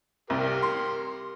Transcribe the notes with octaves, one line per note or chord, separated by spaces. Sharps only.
C2 G4 A#4
C6